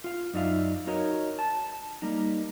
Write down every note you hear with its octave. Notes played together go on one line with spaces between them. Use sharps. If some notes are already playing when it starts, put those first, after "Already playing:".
F4 F5
F#2 D#4 D5 E5 F5
D#4 F#4 A#4 C#5 D#5
A5
G3 A#3 D#4